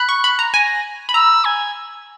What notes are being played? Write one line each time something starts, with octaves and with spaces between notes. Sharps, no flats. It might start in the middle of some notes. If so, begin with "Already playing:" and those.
Already playing: B5 F#6
C#6
B5
A#5
G#5 A#6
B5
A#5 E6
G#5